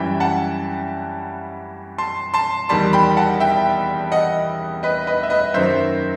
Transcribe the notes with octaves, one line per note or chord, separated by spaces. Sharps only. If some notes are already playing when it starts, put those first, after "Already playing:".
Already playing: F#2 E3 G3 E5 G5
F#5 A5
A5 C6
A5 C6
E2 D#3 G3 A5 C6
G5 B5
F#5 A5
E5 G5
D#5 F#5
B4 D#5
B4 D#5
E5
B4 D#5
F#2 D#3 F#3 C5 E5